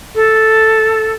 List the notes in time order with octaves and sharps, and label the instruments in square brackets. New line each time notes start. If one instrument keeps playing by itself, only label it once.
[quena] A4